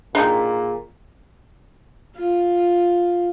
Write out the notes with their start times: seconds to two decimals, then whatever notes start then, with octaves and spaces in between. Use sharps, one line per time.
0.15 A#2 D4 D#4 G4 G#4
2.16 F4